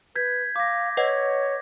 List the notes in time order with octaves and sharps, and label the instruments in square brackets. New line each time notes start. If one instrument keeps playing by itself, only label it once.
[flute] B4 [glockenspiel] G6 G#6 B6
[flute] F5 [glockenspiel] D6 A#6
[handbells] B4 D#5 F#5 [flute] C#5